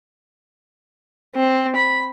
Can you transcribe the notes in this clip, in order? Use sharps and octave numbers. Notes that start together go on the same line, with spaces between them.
C4
B5